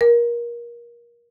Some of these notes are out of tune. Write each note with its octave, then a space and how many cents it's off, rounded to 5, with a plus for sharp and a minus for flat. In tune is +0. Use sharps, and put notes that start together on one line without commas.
A#4 +25